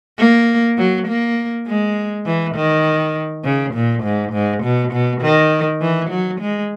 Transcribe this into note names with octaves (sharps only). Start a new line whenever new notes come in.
A#3
F#3
A#3
G#3
E3
D#3
C#3
A#2
G#2
G#2
B2
B2
D#3
E3
F#3
G#3